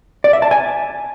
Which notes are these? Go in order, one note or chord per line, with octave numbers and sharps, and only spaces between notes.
D5
E5
A5
G#5